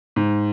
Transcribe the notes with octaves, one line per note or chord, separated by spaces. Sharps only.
G#2